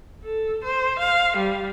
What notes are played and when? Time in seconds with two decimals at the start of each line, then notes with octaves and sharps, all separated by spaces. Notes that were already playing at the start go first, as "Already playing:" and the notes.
0.24 A4
0.64 C5
0.99 F5
1.37 G3